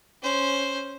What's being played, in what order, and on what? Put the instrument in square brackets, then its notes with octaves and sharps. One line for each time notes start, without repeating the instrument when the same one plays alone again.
[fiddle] C#4 C5